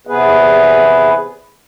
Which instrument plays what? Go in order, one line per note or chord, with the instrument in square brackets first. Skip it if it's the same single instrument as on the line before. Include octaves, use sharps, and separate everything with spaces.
[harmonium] E2 C3 B3 G#4 B4